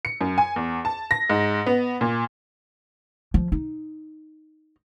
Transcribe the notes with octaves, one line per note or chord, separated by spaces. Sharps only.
C#7
F#2
G#5
E2
A5
A#6
G#2
B3
A#2
F3
D#4